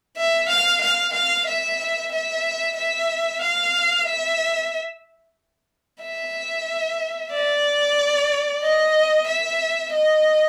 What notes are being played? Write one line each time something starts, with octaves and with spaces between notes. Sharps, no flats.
E5
F5
F5
F5
E5
E5
E5
F5
E5
E5
D5
D#5
E5
D#5